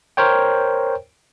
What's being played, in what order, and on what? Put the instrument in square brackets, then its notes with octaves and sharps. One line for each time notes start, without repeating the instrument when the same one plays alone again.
[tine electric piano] A#4 C5 C#5 G5